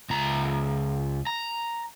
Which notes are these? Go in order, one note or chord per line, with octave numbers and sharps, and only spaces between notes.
C#2 A#5
A#5